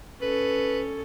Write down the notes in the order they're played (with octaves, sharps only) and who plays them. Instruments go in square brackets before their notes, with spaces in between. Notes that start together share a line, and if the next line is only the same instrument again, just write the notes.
[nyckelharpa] C#4 A4 [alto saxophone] B4